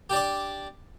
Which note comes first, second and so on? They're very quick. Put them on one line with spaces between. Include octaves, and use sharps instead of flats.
G4 D4 D5